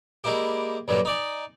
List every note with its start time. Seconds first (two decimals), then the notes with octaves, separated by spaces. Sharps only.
0.24 G3 G#3 A#3 E4 G4
0.88 G2 A#2 D3 F#3 G3
1.05 D#4 D5 G#5